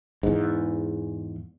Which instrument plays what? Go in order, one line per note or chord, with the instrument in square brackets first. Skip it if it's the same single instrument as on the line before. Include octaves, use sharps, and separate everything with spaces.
[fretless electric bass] E2 G#2